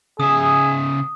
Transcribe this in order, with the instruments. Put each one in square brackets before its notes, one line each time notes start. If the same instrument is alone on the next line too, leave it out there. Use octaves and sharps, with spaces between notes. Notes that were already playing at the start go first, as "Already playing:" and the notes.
[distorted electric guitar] C#3 E5 [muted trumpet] G#4 [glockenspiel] D#6